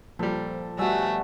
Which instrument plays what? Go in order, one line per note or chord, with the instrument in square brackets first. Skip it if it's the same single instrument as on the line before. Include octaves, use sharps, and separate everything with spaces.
[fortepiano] A#2 G3 [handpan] F3 [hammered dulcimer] A4
[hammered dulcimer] B2 F#5 G#5 [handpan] G3 F#4 [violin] A3 [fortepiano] E6